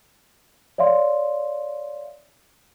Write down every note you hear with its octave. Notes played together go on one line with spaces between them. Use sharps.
C#5 D5 E5 F5 C6